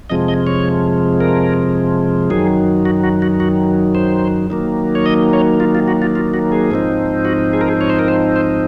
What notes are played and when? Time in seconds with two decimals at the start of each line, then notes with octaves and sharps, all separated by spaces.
0.10 F2 C3 F3 G#3 D#5
0.28 D#5
0.47 C#5
1.20 A#4
2.30 F#2 D#3 F#3 G#4
2.85 F#4
3.04 F#4
3.22 F#4
3.40 F#4
3.95 C5
4.50 D#3 F#3 A#3
4.95 C#5
5.06 D#5
5.33 C#5
5.60 F4
5.75 F4
5.88 F#4
6.02 F4
6.15 F4
6.34 F#4
6.52 G#4
6.71 G#2 F3 C4 D#4
7.25 F#4
7.53 G#4
7.61 A#4
7.68 G#4
7.81 C#5
7.90 C5
7.99 A#4
8.08 C5
8.36 C5